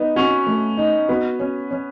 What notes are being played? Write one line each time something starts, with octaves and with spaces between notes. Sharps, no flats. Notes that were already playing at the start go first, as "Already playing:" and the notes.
Already playing: B3 D#4
C#4 F#4
A3
D#4
B3 F#4
C#4
C#4